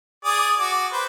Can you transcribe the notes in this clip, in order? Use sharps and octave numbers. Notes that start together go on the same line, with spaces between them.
G#4 D5 D#6
F#4 D6
B4 C5